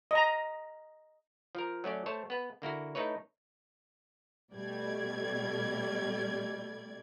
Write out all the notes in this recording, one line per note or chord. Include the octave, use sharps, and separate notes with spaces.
D#5 A#5
F3 A#4
F#3 A3 C#4 D5
A3 C5 C#5 A5
B3 B4
D3 A#3 E4 F#4
A3 D#4 E4 B4 C#5
B2 G3 A3 D5 G#6